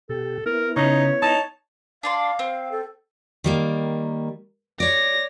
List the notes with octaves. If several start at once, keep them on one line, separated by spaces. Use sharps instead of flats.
B2 G4 A4
B3 E4 A#4
C#3 D#4 C#5
D#4 A5
D4 D5 F5 C6
C4
A4
D#3 G3 A#3
C#5 D5 A#6